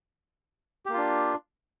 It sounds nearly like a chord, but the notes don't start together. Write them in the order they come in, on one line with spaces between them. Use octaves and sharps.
G4 A#3 F4 D4